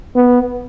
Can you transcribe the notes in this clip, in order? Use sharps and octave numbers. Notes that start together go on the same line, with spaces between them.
B3